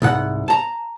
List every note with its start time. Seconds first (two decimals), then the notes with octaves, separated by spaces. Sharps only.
0.02 C2 G#2 F#5
0.48 A5 A#5